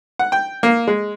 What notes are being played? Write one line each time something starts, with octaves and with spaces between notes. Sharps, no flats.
F#5
G5
A#3
G#3